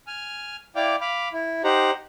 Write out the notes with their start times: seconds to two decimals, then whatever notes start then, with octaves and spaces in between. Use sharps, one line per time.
0.07 G#5 F6
0.76 E4 D5 F5 G5 D6
1.01 F5 B5 D6
1.33 E4
1.64 D#4 G4 C5 F#5 A#5